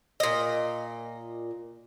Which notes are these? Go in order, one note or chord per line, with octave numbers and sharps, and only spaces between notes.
A#2 D#5